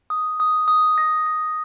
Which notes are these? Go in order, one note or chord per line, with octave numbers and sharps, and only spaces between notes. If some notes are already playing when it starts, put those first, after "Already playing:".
D#6
D#6
D#6
A#6
A#6